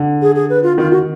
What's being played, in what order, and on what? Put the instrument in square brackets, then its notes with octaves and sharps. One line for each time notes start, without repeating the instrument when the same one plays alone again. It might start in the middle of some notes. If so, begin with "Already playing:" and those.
Already playing: [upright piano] D3
[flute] G#4
G#4
B4
F4
[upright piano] D#3 [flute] F4
[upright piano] D#3 [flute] F#4